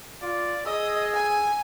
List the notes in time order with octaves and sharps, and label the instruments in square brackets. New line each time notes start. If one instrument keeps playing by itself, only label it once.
[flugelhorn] F4 [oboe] D5
[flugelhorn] G#4 [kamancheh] D#5 [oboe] E6
[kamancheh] G#5